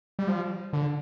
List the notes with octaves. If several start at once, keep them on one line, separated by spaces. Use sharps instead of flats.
G3
F3
D3